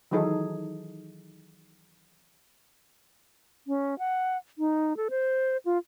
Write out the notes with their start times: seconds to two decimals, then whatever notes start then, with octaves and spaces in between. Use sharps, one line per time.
0.11 D#3 E3 F#3 D#4 G#4 A4
3.67 C#4
3.99 F#5
4.58 D#4
4.97 A4
5.10 C5
5.65 F4